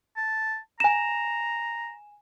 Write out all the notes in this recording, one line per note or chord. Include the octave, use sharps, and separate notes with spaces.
A5
G#5 A#5 E7